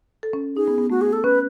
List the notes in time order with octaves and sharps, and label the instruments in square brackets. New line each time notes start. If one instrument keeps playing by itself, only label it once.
[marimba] A4
C#4
[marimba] D#4 [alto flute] G#4
[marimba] B3
B3
[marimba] A3 [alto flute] F#4
[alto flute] G#4
A4
[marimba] C#4 [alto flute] B4